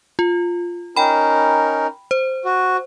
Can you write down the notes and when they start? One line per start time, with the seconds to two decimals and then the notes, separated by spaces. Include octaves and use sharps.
0.19 F4
0.96 C#4 D#4 A#4 G5 B5
2.11 C5
2.45 F#4